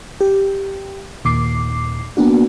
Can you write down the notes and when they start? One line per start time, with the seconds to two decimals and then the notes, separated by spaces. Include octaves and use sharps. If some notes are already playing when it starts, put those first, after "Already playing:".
0.21 G4
1.25 D#2 A#2 D6 C7
2.17 A#3 B3 D4 F#4